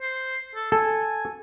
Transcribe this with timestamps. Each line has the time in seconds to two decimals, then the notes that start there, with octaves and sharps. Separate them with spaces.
0.01 C5
0.55 A4
0.72 A4 G#5